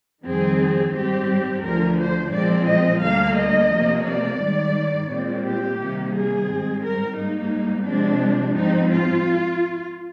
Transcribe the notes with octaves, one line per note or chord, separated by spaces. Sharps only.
F2 D#3 G3 C4 G#4
G#2 G3 C4 G4
D2 D3 F3 A#4
C5
A#2 F3 G#3 C4 D5
D#5
D2 D3 G3 A#3 F5
D#5
C3 F3 A#3
D5
G#2 D#3 G3
A#2 G#3 C4
G4
C3 D#3 G3 A#3
G#4
G#2 G3 C4
A#4
G#2 G3 A#3 D#4
C3 F3 G#3 C4 D4
G#2 F3 C4 D#4
F4